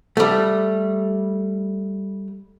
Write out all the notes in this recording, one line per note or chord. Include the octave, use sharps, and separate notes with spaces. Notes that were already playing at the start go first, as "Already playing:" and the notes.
G3 A3